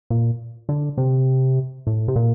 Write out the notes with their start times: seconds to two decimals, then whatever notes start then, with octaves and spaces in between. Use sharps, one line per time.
0.10 A#2
0.69 D3
0.98 C3
1.87 A2
2.08 C3
2.16 A#2